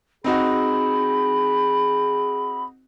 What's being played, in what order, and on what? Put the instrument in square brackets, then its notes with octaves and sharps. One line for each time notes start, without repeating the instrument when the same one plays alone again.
[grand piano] C4 D#4 F#4 [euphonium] G#4 [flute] B5